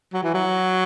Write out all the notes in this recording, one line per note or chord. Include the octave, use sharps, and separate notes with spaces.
F#3
E3
F#3